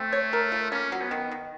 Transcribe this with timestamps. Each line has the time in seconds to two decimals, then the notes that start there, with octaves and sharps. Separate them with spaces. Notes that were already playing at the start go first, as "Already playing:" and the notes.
Already playing: A3 C4
0.13 C#5
0.33 A#4
0.52 F4
0.71 A#3 C#4
0.92 F#3
1.02 B3
1.11 D#3
1.31 D#3